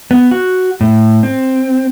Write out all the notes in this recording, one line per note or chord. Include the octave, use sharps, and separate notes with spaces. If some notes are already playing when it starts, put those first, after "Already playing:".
B3
F#4
A2
C4